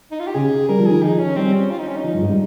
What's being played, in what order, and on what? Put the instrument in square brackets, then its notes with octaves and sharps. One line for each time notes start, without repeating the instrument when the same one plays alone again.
[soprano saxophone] D#4
F4
G4
[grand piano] C#3 [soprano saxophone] G#4
[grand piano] G3 [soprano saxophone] A#4
[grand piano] F3
[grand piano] D#3 [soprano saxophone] G#4
[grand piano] F3 [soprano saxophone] D#4
[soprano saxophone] C#4
[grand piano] G3 [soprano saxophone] C4
[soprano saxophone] C#4
F4
D#4
C#4
D#4
[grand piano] F3
G2
G#2
G3